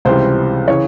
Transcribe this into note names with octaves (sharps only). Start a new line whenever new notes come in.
C#2 C3 E3 G3 C5
C#3 E3 C#5